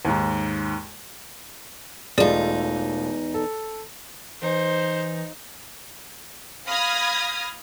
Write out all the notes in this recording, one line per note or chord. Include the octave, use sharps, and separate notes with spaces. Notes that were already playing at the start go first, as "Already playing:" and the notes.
D#2 G#2
E1 E2 A3 D#4 F4 G#4 D5
A4
E3 D#4 C5
F5 B5 D#6 F6 G#6 A#6